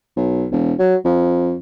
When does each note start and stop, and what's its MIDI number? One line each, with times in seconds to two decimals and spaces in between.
0.17 0.46 35
0.51 0.73 28
0.79 0.96 54
1.05 1.57 41